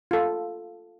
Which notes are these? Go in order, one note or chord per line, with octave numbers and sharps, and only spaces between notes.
F4 A4